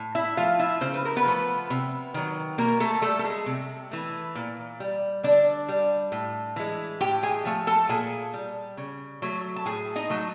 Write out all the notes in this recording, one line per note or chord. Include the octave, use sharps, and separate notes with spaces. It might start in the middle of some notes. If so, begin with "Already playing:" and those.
Already playing: A2
E4 E5
F3 A3 F4 F5
E4 E5
C#3 C5
B4
A#4
B3 B4
F3 A3
C3
D#3 F#3
B2 A#3 A#4
A3 A4
G3 A3 A4
A4
G#3 G#4
C3
E3 A3
A#2
G3
D3 D4 D5
G3
A2
E3 G#3
A2 G4 G5
G#4 G#5
F3 A3
A4 A5
A#2 G#4 G#5
G3
C#3
F#3 A3
A5
A2 G#4 G#5
D#4 D#5
F#3 A3